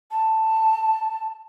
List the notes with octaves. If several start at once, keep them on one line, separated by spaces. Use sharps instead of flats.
A5